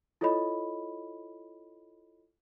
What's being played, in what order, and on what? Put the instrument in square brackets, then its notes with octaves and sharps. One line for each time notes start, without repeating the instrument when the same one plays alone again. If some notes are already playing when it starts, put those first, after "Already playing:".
[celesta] E4 F4 A4 C#5 D#5 B5